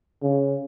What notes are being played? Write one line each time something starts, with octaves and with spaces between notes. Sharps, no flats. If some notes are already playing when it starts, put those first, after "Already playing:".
C#3